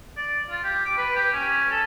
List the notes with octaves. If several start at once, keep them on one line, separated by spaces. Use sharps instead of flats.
D5
F4
G4
D6
B4
G4
C#4
A4